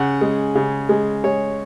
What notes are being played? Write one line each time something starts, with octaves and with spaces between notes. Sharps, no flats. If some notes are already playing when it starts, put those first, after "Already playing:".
Already playing: C#3 F#5
G#3
C#3
G#3
G#3 C#5